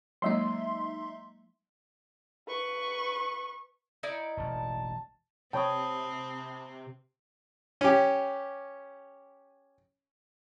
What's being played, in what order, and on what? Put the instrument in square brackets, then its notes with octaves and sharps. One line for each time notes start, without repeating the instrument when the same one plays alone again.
[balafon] F#3 G#3 A#3 [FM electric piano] D#4 E5 C6
[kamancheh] B4 C#6
[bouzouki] D#4 E4 D5
[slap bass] E1 A1 [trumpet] A5
[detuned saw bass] C3 [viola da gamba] C4 [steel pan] C#5 G5 [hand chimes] A5 B5 D#6
[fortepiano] C#4 G4